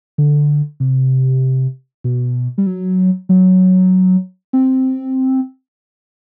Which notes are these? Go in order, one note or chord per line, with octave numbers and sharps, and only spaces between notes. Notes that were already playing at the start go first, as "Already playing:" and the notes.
D3
C3
B2
G3
F#3
F#3
C4